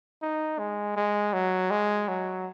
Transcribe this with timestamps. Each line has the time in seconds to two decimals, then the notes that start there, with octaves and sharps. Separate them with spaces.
0.22 D#4
0.59 G#3
0.96 G#3
1.33 F#3
1.70 G#3
2.08 F#3